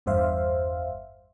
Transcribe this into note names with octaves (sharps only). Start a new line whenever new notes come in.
G1 E2 G2 C5 E5 F5